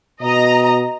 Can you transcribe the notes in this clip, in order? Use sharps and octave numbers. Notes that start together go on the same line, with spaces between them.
B2 D#5 A#5